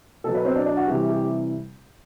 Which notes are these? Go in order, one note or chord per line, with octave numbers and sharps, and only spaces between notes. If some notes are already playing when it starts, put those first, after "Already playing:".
B2 F#3 A4
B4
C4
D4
D4
F#4
C3 E3 G3 G4
G4